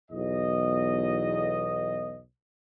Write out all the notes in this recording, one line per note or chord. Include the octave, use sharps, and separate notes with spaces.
B1 E2 D#5